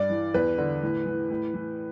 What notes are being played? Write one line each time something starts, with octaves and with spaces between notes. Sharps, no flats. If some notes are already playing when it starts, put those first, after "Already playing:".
Already playing: G2 D5
E3
E2 B4
D3
A2
E3
A2
E3